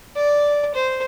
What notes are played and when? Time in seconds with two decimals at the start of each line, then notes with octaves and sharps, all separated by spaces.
0.16 D5
0.75 C5